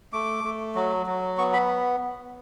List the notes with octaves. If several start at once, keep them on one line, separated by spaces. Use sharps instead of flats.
A3 D6
A3
F#3
F#3
B3 C#6
B5